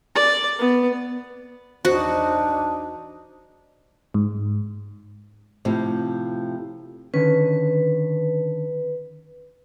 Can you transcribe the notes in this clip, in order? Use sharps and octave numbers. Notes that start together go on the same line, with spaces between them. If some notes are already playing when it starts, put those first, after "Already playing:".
D5
B3
E2 D4 D#4 F#4 C5
G#2
A2 C3 F3
D3 D#3 C#4 B4